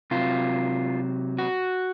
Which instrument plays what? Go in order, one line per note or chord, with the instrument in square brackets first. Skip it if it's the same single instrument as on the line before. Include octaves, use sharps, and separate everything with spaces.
[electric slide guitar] C3 F#3 F4
F#4